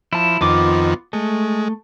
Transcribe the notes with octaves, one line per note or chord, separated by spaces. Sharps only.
F3 E4 A5
F2 D#3 B3 F4 D6
G#3 A3